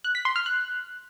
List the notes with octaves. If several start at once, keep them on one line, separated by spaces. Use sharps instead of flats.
F#6
B6
C6
F6
F#6